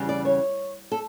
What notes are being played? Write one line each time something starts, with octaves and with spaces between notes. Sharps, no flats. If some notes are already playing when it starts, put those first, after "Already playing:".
Already playing: E2 C#3 G3
D5
C#5
A4